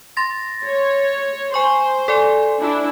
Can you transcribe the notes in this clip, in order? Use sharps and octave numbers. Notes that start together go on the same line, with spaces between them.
C6 A6 A#6
C#5
C5 G#5 C#6
A4 D5 G#5
D4 E4